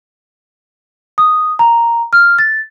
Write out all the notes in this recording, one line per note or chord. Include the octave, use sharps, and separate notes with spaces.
D#6
A#5
F6
A6